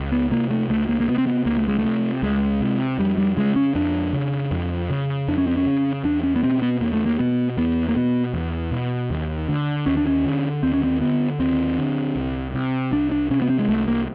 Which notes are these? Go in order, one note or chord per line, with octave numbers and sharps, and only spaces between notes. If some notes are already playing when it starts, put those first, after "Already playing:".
Already playing: C#2
B3
C3 A#3
A3
C#2 A3
A#3
A#3
C3 B3
C4
B3
C#2 A#3
A3
G#3
A3
C3
C#2 G#3
C3
F2 G3
G3
C#3 G#3
C#4
F2 D4
C#3
F2
C#3
F2 D4
C#4
C4
C#4
C#3
E2 D4
C#4
B3
B2 C4
B3
E2 A#3
A3
A#3
B2 B3
E2 B3
A#3
B2 B3
E2
B2
D#2
D3
D#2 C#4
D4
C#4
D3
D#2 C4
C#4
C4
D3 B3
D#2 C4
D3
C2
C3
C2 D4
D4
C3 C#4
B3
C4
G#3
C2 A3
A#3